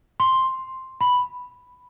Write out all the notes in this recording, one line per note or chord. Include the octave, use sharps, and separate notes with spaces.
C6
B5